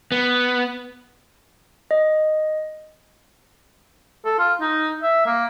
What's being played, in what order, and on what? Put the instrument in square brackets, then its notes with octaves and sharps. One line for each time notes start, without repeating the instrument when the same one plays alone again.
[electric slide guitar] B3
[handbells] D#5
[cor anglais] A4
F4
D#4
E5
A#3